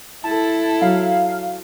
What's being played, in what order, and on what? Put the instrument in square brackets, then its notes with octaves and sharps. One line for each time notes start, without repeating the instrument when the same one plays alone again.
[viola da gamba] E4 A4 [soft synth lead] A5
[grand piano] F#3 [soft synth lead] F5